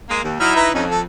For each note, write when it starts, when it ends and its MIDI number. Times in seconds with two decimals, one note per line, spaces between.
0.10 0.24 56
0.10 0.24 58
0.24 0.39 39
0.40 0.51 54
0.40 0.72 63
0.40 0.72 64
0.40 0.51 89
0.56 0.69 71
0.56 0.69 76
0.56 0.69 82
0.74 1.03 41
0.74 0.84 61
0.74 0.84 63
0.90 1.00 69